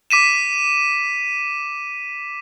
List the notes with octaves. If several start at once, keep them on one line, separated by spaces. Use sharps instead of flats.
D6 B6 D#7 E7